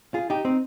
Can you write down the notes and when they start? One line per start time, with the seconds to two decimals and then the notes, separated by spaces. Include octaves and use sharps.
0.14 F4 G#4
0.30 D#4 G4
0.45 C4 D#4